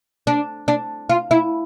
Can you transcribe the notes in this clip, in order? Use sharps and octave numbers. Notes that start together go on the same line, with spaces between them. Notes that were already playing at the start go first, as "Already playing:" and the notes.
D4
D4
F4
E4